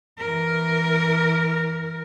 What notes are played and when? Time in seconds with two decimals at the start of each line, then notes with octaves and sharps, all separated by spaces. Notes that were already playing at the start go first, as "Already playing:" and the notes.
0.18 E3 A#4